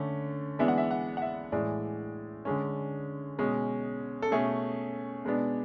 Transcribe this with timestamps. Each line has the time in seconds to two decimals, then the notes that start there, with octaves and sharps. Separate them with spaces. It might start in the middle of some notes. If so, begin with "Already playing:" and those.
Already playing: D3 A3 C#4
0.59 E3 G#3 B3 D4 E5
0.68 F#5
0.78 E5
0.91 F#5
1.17 F#5
1.22 E5
1.52 A2 E3 G#3 D5
2.45 D3 G#3 C#4
3.39 B2 G#3 C#4
4.22 A4
4.31 B2 A3 C#4 G#4
5.25 B2 G#3 B3 D4